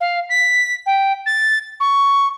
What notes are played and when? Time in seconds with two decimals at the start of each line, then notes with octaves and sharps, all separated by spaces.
0.01 F5
0.29 B6
0.86 G5
1.26 A6
1.80 C#6